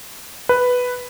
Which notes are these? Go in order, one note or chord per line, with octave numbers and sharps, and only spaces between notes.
B4